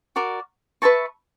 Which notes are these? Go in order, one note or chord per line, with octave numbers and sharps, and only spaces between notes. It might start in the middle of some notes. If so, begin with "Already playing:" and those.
F#4 A#4 D5
B4 E5 A5 C#6